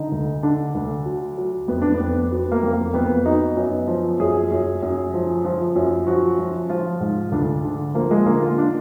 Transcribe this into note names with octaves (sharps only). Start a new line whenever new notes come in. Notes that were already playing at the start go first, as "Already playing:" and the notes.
Already playing: D3 D#4
D2
D3 D4
D2
F#3
F#3
F2 B3
D4
B3
F2
F#3 B3
A#3
F2
A#3
F2 B3
F#3 D#4
F#2 B3
F3
F#2 G#4
F#2
F#2
F3
F3
F#2
F3 F#4
F3
F3 F4
G#2
D2 D4
D3
F3 A#3
G#3
D3 A#3
F4
D4